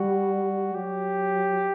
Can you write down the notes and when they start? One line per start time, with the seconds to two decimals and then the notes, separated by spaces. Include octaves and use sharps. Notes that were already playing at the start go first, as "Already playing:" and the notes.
Already playing: G3 F#4
0.74 F#3 G4